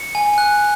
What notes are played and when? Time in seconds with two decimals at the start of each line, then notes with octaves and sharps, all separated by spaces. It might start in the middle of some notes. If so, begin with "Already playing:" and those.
Already playing: C#7
0.15 G#5
0.38 F#6